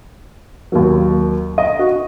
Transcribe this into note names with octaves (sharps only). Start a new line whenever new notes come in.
D#2 D#3 F#3
D#5
F#4